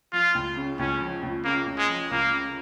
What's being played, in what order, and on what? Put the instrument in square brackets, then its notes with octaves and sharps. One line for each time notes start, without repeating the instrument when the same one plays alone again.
[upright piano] F3 [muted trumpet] F4
[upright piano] C#2
C#3
[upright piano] C#2 [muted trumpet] C#4
[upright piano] F3
C#2
[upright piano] C#3 [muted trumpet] A#3
[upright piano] C#2
[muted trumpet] G#3
[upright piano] F3
[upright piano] C#2 [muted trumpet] A#3
[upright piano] C#3